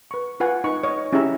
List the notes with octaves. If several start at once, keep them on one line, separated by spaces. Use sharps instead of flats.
B4 C#6
F4 B4 F#5 G#5
D#4 B4 C#6
C#5 D#5
C#4 E4 G4 G#4 E5 A#5